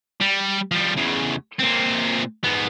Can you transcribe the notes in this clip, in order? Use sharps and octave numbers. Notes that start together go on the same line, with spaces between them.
G3
F3 G3
E2 C#3
A#2 C4
G#2 B3